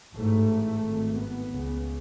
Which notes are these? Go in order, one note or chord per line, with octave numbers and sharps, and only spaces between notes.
A1 G#2 A3
G#1 G#2
B3
C#2 C#3